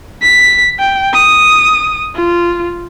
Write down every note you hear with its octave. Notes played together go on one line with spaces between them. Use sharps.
B6
G5
D#6
F4